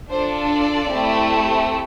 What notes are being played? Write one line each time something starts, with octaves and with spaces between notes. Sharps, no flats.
D4 F4 A4 C5
D5
A3 C4 E4 G4